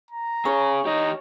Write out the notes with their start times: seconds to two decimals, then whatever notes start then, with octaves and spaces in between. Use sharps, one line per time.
0.11 A#5
0.45 C#4 G#4 C#5
0.86 D#4 G4 D#5